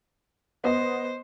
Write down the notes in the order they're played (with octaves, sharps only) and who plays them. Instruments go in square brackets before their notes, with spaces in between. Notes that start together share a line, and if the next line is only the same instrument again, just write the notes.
[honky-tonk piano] B3 D#5 [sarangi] C5